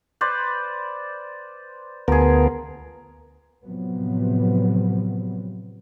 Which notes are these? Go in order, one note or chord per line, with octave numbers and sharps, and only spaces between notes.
B4 C5 D5
D2 F3 B3 G#4 A#4
A2 C3 F3 F#3 B3